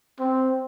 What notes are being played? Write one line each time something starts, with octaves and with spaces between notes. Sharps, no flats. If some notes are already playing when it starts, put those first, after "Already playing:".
C4